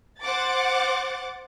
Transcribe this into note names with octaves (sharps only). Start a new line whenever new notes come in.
C5 F#5 D6 A6